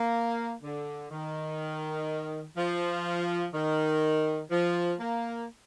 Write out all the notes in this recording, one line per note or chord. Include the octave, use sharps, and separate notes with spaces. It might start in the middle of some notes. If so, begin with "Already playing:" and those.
Already playing: A#3
D3
D#3
F3
D#3
F3
A#3